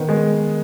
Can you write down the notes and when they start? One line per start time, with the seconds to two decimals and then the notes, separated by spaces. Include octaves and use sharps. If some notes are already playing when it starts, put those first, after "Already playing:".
Already playing: D#3 B3
0.09 G#3